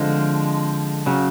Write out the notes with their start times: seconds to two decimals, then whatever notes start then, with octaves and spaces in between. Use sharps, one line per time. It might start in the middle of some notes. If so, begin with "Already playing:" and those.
Already playing: D3 F3 G#3 C4
1.06 C#3 F#3